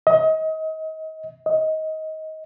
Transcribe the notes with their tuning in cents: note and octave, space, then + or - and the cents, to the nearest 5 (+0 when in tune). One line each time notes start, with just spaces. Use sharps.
D#5 +30
D#5 +20